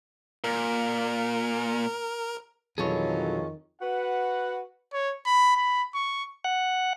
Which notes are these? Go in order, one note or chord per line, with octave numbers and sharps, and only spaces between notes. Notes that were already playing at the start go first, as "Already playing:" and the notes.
A#2 A#4
F2 B2 D#3 E3 F#3 G#4 A4 C#5
F#4 B4 F#5
C#5
B5
B5
C#6
F#5